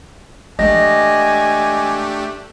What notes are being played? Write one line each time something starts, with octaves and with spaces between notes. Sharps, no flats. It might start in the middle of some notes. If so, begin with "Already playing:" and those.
E3 G#3 A3 D4 G4 D#5 G#5 A#6